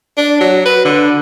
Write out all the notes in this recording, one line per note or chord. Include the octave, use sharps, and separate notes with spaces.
D4
F#3
B4
D3